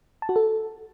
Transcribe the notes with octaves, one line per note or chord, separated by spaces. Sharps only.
A5
F#4
A4